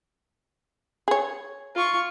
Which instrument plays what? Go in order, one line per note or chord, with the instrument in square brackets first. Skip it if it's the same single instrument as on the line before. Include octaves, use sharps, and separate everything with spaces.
[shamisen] G#4 C#5
[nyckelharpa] F4 C#6